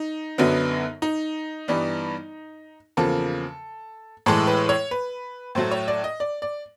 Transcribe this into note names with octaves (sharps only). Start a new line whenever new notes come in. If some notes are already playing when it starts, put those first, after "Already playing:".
Already playing: D#4
F#2 D3 F#3 B3
D#4
G2 E3 G3 B3
E2 C#3 F3 A#3 A4
A2 E3 G#3 A4
B4
C#5
B4
A2 F#3 A3 C5
C#5
D5
D#5
D5
D5